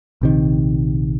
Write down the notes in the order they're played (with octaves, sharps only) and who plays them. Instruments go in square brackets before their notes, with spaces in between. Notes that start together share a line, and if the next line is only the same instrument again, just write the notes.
[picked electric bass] A#1 C3 D#3